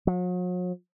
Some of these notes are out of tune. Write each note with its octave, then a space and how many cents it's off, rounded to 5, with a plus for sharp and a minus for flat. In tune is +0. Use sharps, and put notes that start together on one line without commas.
F#3 -45